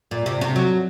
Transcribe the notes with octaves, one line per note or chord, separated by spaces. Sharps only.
A#2
C3
C3
F#3